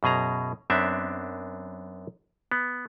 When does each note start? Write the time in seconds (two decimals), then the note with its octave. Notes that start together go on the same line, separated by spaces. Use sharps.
0.03 F#2 B2 G#4 A#5
0.70 F#2 B3 C4 D4 E5
2.52 B3